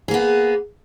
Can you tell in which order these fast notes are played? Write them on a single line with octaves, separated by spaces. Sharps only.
G#4 A#3 B3